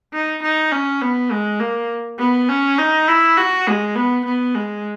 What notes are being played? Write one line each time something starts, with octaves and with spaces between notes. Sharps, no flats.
D#4
D#4
C#4
B3
G#3
A#3
B3
C#4
D#4
E4
F#4
G#3
B3
B3
G#3